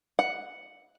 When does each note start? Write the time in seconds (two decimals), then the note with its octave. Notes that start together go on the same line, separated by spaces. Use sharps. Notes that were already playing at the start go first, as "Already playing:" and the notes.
0.19 F#5